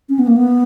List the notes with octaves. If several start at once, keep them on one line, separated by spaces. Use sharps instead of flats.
C#4
B3
A#3
B3